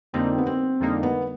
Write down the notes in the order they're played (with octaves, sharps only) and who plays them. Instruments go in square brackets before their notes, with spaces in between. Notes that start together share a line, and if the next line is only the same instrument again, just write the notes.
[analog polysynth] F2 D3 G3 A#3 D#4 [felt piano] C4
[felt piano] B3
C4
[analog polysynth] F2 D3 G3 A#3 D#4
[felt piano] B3